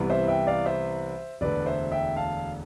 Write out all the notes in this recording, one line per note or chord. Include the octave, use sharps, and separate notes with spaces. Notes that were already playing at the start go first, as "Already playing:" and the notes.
Already playing: C2 C3 E3 G3 B3
C5 E5
E5 G5
D5 F5
C5 E5
E1 D2 D3 B4 D5
C5 E5
E5 G5
F5 A5